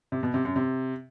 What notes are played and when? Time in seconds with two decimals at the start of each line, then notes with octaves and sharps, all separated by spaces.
0.12 C3
0.23 B2
0.34 C3
0.45 F#2
0.56 C3